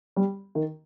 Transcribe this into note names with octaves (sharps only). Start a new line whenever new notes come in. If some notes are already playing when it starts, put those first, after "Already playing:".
G3
D#3